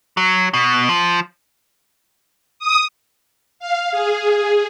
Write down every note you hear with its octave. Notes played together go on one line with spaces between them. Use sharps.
F#3
B2
F3
D#6
F5
G#4